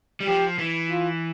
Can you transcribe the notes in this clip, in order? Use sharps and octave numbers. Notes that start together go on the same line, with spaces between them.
G3
F3 G4
E3
F4